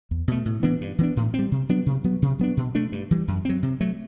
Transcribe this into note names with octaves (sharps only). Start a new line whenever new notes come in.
E2
B2 A3
A2
E3 B3 D4
G2
E3 B3 D4
A2
C4
G3
C3
F#3 B3 D4
C3
F#3 B3
C3
F#3 B3 D4
B2
A3 D4
G2
E3 G3
F#2
F#3 C4
C3
F#3 A3